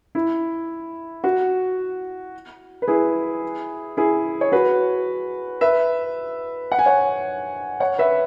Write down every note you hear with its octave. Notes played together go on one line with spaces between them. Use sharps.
E4
F#4
B4
E4 G#4
E4 G#4
C#5
F#4 B4
B4 E5
F#5
G#5
C#5 F#5
C#5 F#5
B4 E5